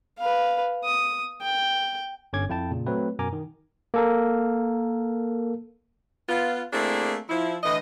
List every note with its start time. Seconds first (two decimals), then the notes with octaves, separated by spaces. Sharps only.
0.19 B4 F5
0.84 D#6
1.42 G5
2.33 G1 D3 C#4 D6 G#6
2.49 F2 E4 G5 A5
2.71 A#2 C#3
2.86 F#3 A3 C4 B4
3.19 F#2 B2 A#4 G#5 A#5 D6
3.33 D#3
3.94 A#3 A4 A#4
6.28 B3 F4
6.72 A3 A#3 C4 D4 E4 G#4
7.29 F3 E4
7.63 A2 D3 E3 D#5